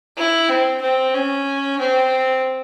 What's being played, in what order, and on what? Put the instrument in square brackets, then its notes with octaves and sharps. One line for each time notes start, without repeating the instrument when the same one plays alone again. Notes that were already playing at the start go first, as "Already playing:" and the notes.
[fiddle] E4
C4
C4
C#4
C4